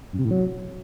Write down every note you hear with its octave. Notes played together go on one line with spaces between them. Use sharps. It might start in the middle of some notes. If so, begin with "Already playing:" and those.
F#2
C3
A2
F#3